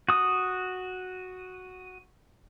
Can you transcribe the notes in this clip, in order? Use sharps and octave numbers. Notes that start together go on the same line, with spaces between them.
F#4 D#6